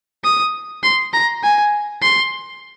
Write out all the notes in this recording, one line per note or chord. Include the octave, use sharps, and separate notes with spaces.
D#6
C6
A#5
G#5
C6